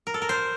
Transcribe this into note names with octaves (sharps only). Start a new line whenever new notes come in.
A#4
A4
A#4
C5